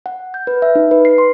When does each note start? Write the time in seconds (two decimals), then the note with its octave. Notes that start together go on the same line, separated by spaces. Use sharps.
0.06 F#5
0.34 G6
0.47 B4
0.62 E5
0.75 D#4
0.91 B4
1.05 C7
1.18 C6